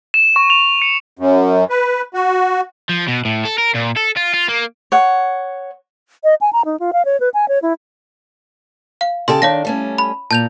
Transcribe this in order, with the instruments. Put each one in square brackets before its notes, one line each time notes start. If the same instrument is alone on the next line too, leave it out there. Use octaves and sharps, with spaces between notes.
[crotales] E7
C#6
F7
C#7
[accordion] F#2
B4
F#4
[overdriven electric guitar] F3
B2
A2
A4
A#4
A#2
A4
F4
F4
A#3
[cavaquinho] C#5 F#5
[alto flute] D#5
G#5
A#5
D#4
F4
F5
C#5
B4
G#5
C#5
E4
[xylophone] F5
[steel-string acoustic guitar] C#3 G4 A4 [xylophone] C6
[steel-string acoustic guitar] D#3 D4 [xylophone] C#5 F5 A#6
[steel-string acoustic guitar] G3 A3 C#4
[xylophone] B5
[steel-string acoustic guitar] A#2 [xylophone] A5 G6 F7